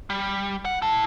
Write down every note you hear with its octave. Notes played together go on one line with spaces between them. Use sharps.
G3
F#5
E4 A5